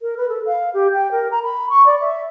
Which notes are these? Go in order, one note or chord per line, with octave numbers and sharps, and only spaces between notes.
A#4
B4
A4
F5
G4
G5
A#4
A#5
B5
C#6
D5
E5